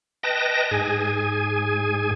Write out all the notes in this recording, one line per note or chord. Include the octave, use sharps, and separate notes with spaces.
B4 D#5 G5 A5 A#6
G#2 G#4 G#5